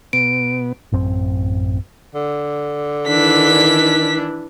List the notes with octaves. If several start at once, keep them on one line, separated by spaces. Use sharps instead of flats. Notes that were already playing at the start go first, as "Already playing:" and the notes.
B2 B3 D7
A1 F#2 C4
D3
D#3 E3 D4 B6